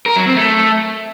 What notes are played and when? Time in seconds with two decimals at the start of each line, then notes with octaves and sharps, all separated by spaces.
0.06 A#4
0.16 F#3
0.26 C4
0.36 A3